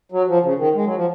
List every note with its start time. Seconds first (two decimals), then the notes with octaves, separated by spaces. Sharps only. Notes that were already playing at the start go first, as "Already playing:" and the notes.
0.12 F#3
0.27 F3
0.43 C#3
0.58 D#3
0.74 G#3
0.85 F#3
0.95 F3